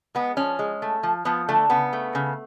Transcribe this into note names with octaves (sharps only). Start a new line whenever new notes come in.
G#3 B3
F3 C#4
G#3
A3
F3
F3 B3
D3 A3
C#3 B3
A3
C#3